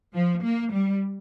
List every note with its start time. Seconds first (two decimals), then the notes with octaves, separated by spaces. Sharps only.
0.14 F3
0.43 A#3
0.72 G3